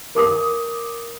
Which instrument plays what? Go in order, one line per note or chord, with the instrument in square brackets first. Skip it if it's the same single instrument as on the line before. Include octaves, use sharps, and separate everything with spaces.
[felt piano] A#4 D6 D#6